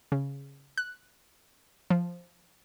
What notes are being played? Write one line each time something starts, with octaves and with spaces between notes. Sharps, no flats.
C#3
F#6
F3